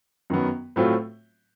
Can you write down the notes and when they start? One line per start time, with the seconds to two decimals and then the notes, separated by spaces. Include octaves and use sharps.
0.30 F#2 D#3 F#3 B3
0.76 A2 F#3 A3 C4 F4